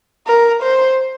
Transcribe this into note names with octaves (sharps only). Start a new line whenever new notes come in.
A#4
C5